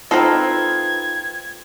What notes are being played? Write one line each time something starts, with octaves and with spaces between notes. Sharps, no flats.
C4 D#4 F4 A4 B4 G#6